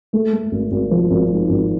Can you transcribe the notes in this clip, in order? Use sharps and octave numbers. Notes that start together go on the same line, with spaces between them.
A3
A3
G#1
G#1
F3
G#1
G#2
G#1